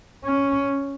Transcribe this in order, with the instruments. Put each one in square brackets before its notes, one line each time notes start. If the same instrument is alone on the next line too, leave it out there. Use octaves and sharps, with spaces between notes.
[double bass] C#4